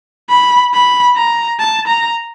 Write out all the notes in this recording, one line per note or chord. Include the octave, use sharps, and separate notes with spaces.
B5
B5
A#5
A5
A#5